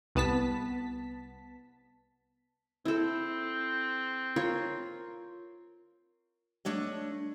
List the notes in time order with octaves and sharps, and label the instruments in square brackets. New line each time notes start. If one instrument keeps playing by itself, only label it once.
[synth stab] C2 B3 A5 B6
[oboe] C4 [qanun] E4 A4
[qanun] F4 A#4 C#5
[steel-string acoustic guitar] A3 D4 C#5 D#5